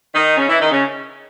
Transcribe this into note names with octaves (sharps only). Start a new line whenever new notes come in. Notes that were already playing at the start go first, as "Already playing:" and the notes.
D#3 D#4
C#3 C#4
E3 E4
D#3 D#4
C#3 C#4